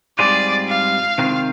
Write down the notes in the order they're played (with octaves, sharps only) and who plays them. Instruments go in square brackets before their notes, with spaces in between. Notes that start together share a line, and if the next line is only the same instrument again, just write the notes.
[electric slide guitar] G#2 G3 C4 F4 G#4 [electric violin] D5
[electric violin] F5
[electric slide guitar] C3 D#3 G#3 C4 F4